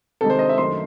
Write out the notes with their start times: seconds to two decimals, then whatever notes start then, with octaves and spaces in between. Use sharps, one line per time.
0.21 C3 D#3 G#3 A4
0.30 C5
0.39 D#5
0.49 E5
0.58 F#2 D#3 A3 C6